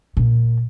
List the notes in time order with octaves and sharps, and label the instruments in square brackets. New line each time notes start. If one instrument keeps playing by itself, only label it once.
[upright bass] A#2